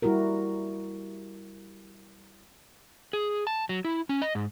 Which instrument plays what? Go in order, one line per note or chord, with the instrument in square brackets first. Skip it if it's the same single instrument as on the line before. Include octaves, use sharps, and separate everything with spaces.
[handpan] G3 E4 F#4 G4 A#4
[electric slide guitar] G#4
A5
F#3
E4
C#4
D#5
G#2